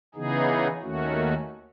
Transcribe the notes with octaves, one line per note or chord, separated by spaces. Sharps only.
C#3 E3 B3 D#4 G#4
D#2 D#3 A3 C#4 F#4